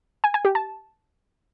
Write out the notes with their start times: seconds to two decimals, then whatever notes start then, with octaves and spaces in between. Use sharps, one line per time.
0.24 G#5
0.34 G#5
0.45 G4
0.55 A5